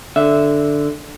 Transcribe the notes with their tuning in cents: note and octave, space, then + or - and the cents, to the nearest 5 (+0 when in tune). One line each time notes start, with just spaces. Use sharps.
D3 +0 E5 +0